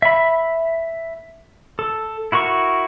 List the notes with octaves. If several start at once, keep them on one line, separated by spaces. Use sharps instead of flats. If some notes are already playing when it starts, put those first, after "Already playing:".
E5 B5
A4
E4 F#4 A#4 C#6